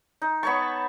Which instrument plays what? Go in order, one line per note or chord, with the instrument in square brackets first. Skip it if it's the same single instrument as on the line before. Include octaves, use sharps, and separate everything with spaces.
[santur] D#4
[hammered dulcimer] B3 C#5 C#6 [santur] A5 B5